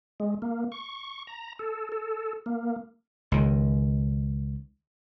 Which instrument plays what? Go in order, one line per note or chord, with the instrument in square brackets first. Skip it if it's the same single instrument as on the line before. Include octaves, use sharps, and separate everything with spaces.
[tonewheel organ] G#3
A#3
C#6
A#5
A4
A4
A#3
[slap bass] C#2 D#3